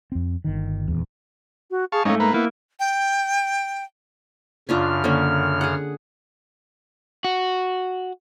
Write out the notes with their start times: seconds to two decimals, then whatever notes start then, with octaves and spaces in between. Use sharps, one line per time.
0.12 F2 C4
0.44 G1 D#3
0.88 D#1 E2
1.71 F#4
1.92 G#4 F5 A5 C#6
2.05 G#2 A3 C#4 D#4 F5
2.20 A#3 B4 A#5
2.34 A#3 B3 E4
2.80 G5
4.69 F#2 C#3 C#4 D4 F4 F6
5.04 D3 A#3 C#4
5.61 G#4 F#5
7.24 F#4